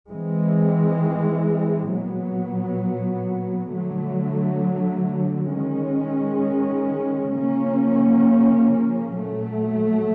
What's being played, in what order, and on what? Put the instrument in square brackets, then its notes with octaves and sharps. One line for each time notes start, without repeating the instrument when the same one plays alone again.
[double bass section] E3 G#3 C4
A#2 F#3 B3
D3 F#3 A3
D#3 G#3 C#4
C#3 F3 A#3 C#4
A#2 F#3 A3